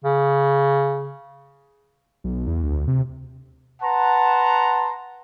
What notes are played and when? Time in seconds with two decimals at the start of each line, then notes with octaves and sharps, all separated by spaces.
0.05 C#3
2.24 B1
2.47 E2
2.63 D2
2.87 C3
3.82 B4 F#5 A5 A#5 C6